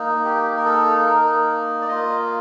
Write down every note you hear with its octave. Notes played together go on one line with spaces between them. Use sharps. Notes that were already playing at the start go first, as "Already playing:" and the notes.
Already playing: A#3 D#4
G4
A#4
A4
A#4
D5
A#3 F4 D#5